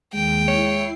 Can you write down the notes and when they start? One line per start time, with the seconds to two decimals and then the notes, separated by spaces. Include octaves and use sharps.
0.14 D#2 G#3 G5
0.48 E4 C#5 C7